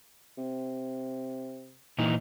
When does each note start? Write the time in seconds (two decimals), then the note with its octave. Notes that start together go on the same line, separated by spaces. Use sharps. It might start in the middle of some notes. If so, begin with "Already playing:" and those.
0.38 C3
1.98 A#2 E3 D#4